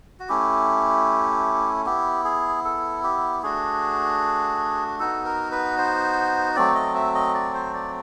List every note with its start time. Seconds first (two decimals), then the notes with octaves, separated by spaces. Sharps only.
0.20 F#4
0.29 A3 C#4 E4 G4
1.86 B3 E4 G4
2.25 G#4
2.65 A4
3.04 G4
3.43 A3 D4 F#4 G#4
4.99 B3 D#4 F#4 A4
5.25 A#4
5.52 B4
5.78 C5
6.56 F#3 A3 C4 D5
6.75 D#5
6.95 E5
7.15 D#5
7.35 D5
7.54 C5
7.74 D5